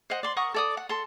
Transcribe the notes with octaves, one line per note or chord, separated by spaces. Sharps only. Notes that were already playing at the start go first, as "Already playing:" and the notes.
C5 D#5 F#5
D5 C6
A#4 F#5 C#6 D#6
A4 D5 D#6
F#5
A4 C6